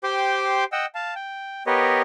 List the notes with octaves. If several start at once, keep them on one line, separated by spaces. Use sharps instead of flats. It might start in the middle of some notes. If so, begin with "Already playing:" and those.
G4 C5 G5 C6 D6
D#5 F#5 G5 E6
F5 A5
G5
B3 G4 A#4 B4 C#5 D#5